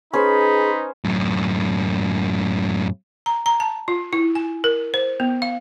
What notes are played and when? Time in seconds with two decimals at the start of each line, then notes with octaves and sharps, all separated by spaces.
0.13 C#4 D#4 G#4 B4 C5 B5
1.05 F#2 A2
3.26 A#5
3.46 A#5
3.60 A5
3.88 F4
4.13 E4
4.35 G#5
4.64 A#4
4.94 C5
5.20 B3
5.42 F5